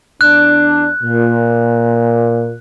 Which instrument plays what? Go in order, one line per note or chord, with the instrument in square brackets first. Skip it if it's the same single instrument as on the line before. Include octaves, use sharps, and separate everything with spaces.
[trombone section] E2 D4 [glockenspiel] F#6
[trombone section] A#2